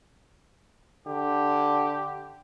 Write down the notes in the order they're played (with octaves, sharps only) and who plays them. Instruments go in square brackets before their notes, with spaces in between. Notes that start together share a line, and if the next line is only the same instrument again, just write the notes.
[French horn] D3 [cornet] G4